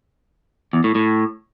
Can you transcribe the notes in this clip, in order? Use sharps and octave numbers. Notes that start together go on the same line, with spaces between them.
E2
A2
A2